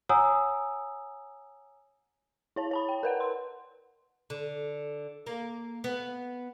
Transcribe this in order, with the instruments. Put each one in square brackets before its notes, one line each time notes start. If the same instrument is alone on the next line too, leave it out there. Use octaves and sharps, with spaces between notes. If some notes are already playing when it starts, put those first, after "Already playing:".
[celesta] C#5 F#5 G#5 A#5 D#6 E6
[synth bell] E4 C#5 A5
C#5 A5 B5
G5
A#4 B4 F#5
C6
[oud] D3
A#3
B3